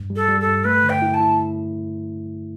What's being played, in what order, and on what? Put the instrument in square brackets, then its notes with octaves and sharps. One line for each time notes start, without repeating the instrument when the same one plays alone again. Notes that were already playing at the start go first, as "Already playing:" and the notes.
Already playing: [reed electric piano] G2
G3
[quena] A4
[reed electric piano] G3
[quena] A4
[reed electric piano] G2
[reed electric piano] A3 [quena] B4
[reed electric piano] D3
[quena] G5
[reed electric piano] E4
[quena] A5
[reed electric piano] E4